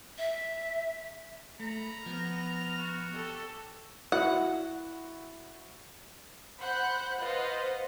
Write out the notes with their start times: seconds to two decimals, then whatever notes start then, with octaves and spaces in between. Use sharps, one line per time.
0.18 E5
1.60 A3 A#5 B5
2.06 F3 B3 F6
2.78 F#4
3.13 G4 A4
4.12 E4 F#4 F#5
6.59 C5 F#5 B5 F#6 G6
7.19 F4 B4 C5 D#5 F5 F#5